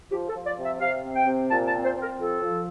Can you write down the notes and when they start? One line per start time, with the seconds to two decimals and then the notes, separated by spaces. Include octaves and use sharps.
0.11 F3 G4
0.29 A4
0.34 F3
0.46 D5
0.57 C3
0.63 E5
0.80 C3 F5
1.04 C4
1.15 G5
1.26 C3
1.50 A#2 A5
1.66 A5
1.73 C4
1.84 C5
1.96 C4
2.02 A#4
2.18 F3 A4
2.41 F3